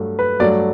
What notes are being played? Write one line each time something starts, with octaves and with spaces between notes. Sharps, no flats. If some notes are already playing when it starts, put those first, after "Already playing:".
Already playing: G2 F#3 A3
B4
G2 F#3 A3 D5